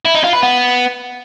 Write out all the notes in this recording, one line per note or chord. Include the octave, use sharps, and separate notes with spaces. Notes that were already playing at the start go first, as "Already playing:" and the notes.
E4
D#4
F4
B4
B3